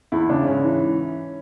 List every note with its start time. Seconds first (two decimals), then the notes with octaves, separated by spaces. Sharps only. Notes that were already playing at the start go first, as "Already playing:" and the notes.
0.12 E2 E4
0.29 C#3 D4
0.47 G#2 C#4
0.64 E3